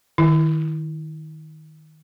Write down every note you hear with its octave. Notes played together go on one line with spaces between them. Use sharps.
D#3 E4